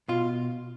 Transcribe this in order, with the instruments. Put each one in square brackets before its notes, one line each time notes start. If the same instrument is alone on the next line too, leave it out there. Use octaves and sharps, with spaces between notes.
[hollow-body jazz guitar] B2 F4